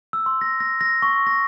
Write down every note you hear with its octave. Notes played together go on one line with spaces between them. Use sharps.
E6
C6
A#6
A#6
A#6
C#6
A#6